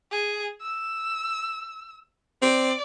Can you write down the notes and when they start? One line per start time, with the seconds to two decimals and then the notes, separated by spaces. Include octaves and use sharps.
0.12 G#4
0.62 E6
2.42 C4 D5